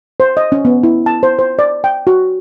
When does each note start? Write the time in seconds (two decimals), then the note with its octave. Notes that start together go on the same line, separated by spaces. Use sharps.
0.20 C5
0.37 D#5
0.52 C#4
0.65 B3
0.83 E4
1.06 A5
1.23 C5
1.39 C5
1.59 D5
1.84 G5
2.07 F#4